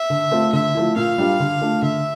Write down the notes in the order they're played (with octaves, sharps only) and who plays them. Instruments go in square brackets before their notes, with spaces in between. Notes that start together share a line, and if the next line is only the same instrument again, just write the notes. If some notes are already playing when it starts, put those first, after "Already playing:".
Already playing: [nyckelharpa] E5
[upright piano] D3
A3 C4 F4
[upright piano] D3 [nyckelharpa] E5
[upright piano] F3 A3 E4
[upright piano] A#2 [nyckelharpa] F5
[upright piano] G3 D4 F4
D3
A3 D4 F4
[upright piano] D3 [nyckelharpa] E5